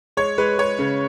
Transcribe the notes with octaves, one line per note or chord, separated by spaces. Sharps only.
G#3 C#5
G#3 B4
G#3 C#5
C#3